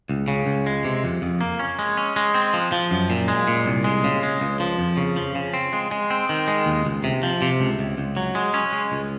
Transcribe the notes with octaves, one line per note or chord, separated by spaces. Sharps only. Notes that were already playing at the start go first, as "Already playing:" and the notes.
C#2
C#3
C#2
G#3
C3
F2
F2
A#3
C#4
G#3
C#4
G#3
C4
F3
F3
F#2
A#2
G#3
A#2
C2
G#3
C#3
G#3
C#2
F3
F2
C#3
F3
C#3
C4
G#3
G#3
C4
D#3
G#3
D#2
C#2
C3
F3
C3
C#2
C#2
C#2
F#3
G#3
C#4
G#3
C#2